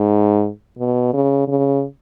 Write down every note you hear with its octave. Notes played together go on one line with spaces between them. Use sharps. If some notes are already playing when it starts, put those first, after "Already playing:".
Already playing: G#2
B2
C#3
C#3